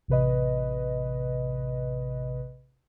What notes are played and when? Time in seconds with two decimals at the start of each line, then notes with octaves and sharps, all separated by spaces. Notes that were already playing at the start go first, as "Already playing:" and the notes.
0.08 A1 C3 B4 D#5